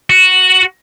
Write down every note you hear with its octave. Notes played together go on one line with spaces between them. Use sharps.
F#4